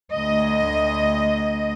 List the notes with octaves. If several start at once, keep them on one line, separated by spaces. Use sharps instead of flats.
D2 D#5